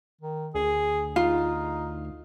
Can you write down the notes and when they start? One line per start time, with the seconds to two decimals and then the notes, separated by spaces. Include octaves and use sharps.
0.21 D#3
0.55 D2 G#4
1.16 D#4 F4